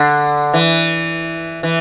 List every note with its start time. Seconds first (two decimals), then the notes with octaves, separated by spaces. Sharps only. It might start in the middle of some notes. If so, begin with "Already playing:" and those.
Already playing: D3
0.54 E3
1.63 E3